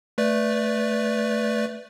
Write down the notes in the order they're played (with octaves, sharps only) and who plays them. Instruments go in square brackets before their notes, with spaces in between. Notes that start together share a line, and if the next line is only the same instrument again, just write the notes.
[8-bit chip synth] A3 B4 D5